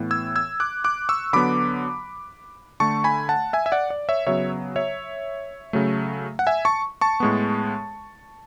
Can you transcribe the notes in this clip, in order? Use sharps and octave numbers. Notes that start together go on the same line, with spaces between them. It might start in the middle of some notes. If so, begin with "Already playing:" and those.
Already playing: A2 E3 B3
E6 G#6
E6 G#6
D6 F#6
D6 F#6
C#6 E6
D3 F#3 B3 B5 D6
D3 A3 A5 C#6
G#5 B5
F#5 A5
E5 G#5
E5
D5 F#5
D5
C#5 E5
C#3 F#3 B3 C#5 E5
C#5 E5
C#3 F#3 A3
F#5
E5 G#5
A5 C#6
A5 C#6
A2 G#3 B3